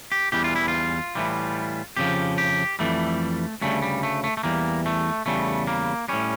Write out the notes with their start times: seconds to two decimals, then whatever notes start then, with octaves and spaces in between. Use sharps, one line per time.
0.12 G4
0.32 E2 E3 G3 G4
0.44 F4
0.56 E4
0.68 F4
1.15 A2 E3 G3
1.97 F2 C#3 F3 G4
2.38 G4
2.79 F2 E3 G3 A3
3.62 D2 C#3 G3 A3
3.82 G3
4.03 A3
4.24 A3
4.37 A3
4.43 E2 E3 G3 A#3
4.86 A3
5.26 E2 C#3 G3 A3
5.67 A#3
6.08 A2 G3 C#4